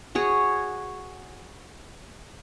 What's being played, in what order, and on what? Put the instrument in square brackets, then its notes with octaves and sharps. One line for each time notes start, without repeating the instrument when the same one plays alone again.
[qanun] F#4 G#4 C#5